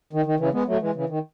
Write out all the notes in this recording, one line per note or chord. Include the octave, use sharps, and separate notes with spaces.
D#3
D#3
C#3 E3
G#3 B3
F#3 A3
E3 G#3
C#3 E3
D#3